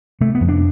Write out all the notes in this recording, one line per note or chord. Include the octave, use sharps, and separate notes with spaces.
C3 A3
B3
F2
D4